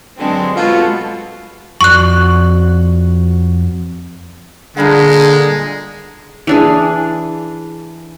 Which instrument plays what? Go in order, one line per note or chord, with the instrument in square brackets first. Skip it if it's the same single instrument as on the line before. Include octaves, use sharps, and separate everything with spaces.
[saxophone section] G2 D3 [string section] F#3 G#3 C4
[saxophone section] B2 [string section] G#3 F#4 A4 [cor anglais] F4
[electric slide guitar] F2 F#4 D5 [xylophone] C#6 F#6
[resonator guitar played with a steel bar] A#2 G3 F#5 [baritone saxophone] D3 [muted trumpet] G#3 [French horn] G#4
[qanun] E3 D4 G#4